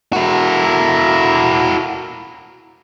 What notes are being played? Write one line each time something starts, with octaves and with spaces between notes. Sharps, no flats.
A#3 E4 F#4 A4 A#5